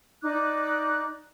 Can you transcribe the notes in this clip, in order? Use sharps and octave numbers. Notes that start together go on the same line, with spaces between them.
D#4 D5 D6 F#6